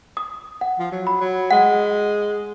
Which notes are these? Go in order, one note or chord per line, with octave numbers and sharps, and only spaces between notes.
D#6
F#5
F3
F#3
B5
F#3
G#3 F#5